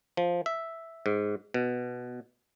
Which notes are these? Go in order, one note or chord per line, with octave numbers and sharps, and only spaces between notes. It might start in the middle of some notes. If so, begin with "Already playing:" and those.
F3
E5
G#2
B2